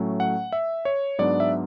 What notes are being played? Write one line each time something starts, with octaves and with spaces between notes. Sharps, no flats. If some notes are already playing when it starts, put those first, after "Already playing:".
Already playing: A2 F#3 A3 C#4
F#5
E5
C#5
G#2 F#3 B3 D4 D5
E5